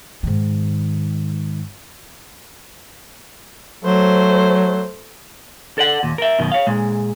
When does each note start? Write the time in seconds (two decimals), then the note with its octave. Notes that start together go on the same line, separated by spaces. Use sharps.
0.23 G#2 D#3
3.84 F#3 A3 C5
5.78 A4 D5 F#5
6.03 D#2 A#2
6.18 A#4 E5
6.39 F#2 B2 D#3
6.52 C#5 F5
6.67 A#2 G#3